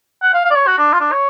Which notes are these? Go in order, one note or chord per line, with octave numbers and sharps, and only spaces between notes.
F#5
F5
F5
D5
C#5
F#4
D4
F4
D4
C#5